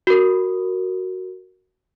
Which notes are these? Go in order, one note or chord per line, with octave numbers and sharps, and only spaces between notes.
F#4 A#4